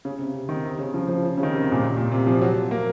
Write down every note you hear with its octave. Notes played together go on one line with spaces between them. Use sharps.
C#3
C3
C3
D#3
C3
C#3
F3
F3
C#3
C#3
D#3
C3
C3
A#2
C3
A#2
C3
F3
F#3
A#3